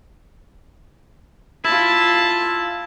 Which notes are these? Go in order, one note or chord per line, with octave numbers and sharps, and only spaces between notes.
E4 F4 A5